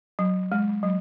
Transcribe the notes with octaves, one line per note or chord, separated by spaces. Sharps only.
F#3
G#3
F#3